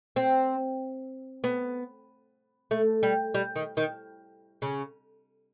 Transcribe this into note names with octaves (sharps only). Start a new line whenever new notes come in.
C4
B3
A3
G3
G3
D#3
D#3
C#3